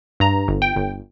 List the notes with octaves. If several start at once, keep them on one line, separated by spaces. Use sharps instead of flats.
G2 A#5
G1
G5
G1